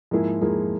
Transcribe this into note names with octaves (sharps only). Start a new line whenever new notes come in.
G#2 F3 A#3 E4 G#4
G#2 F3 A#3 E4 G#4